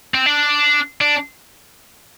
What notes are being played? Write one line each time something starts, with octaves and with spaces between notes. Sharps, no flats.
C4
D4
D4